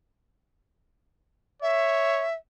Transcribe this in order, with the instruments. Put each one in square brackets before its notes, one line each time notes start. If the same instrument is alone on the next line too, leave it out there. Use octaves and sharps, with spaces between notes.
[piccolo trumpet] C#5 [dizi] E5